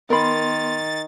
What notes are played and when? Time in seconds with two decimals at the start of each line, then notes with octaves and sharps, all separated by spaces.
0.10 D#3 B3 A#4 B5 C6 A6